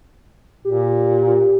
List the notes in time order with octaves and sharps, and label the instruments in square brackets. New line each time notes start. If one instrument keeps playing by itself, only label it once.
[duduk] A#2 [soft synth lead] G4